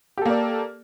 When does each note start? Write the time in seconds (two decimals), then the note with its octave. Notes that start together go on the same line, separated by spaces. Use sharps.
0.18 G4
0.22 A4
0.26 A#3
0.30 D5